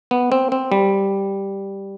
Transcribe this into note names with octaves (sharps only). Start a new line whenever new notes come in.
B3
C4
C4
G3